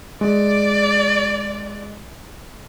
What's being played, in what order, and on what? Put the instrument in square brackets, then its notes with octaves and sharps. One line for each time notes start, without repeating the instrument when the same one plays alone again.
[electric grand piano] G#3 [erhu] D5